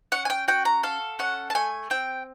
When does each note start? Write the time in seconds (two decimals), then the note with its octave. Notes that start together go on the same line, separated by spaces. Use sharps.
0.12 C#4 F#5
0.25 G#5
0.30 G5
0.48 F#4 G5
0.65 A#5
0.83 A4 F5
1.19 C#4 F#5
1.50 A5
1.55 A3 G#5
1.90 C4 G5